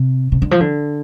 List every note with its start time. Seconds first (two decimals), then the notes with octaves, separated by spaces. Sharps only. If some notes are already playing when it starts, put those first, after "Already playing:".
Already playing: C3
0.32 C3
0.42 D3
0.51 F3
0.60 D3